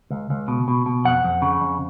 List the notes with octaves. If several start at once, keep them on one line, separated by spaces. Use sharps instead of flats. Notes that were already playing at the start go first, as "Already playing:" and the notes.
C#2
C#2
B2
B2
B2
F2 F#5
F2
C#3
F2